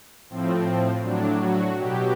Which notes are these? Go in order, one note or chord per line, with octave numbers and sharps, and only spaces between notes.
A2 F3 C4
A2 F#3 D4
F#4
B2 F#3 G4